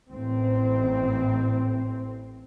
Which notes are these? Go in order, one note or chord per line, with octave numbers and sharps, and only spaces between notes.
A1 C4